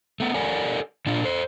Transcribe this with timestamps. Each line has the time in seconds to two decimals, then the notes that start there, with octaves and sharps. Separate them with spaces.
0.20 A3 B3
0.34 G4 A4 A#4 D5 F#5 G#5
1.07 A#2 D4 F4
1.24 A4 C5